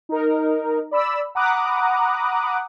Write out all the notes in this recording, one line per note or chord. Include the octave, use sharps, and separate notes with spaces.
D#4 A#4
D5 B5 E6
F#5 A#5 B5 D6 D#6 F#6